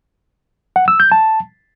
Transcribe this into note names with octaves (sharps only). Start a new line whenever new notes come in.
F#5
E6
G6
A5